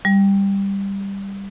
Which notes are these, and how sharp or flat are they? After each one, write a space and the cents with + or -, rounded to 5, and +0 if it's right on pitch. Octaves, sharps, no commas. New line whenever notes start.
G3 +10